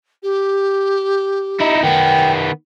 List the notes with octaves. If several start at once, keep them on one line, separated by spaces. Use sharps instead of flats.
G4
D#4 E4
D#3 B3 G5